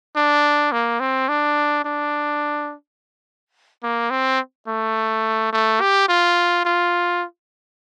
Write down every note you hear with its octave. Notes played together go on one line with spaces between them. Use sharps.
D4
A#3
C4
D4
D4
A#3
C4
A3
A3
G4
F4
F4